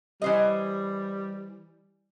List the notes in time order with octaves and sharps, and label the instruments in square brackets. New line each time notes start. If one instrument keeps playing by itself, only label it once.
[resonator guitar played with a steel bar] E3 C5 D#5 [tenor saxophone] G3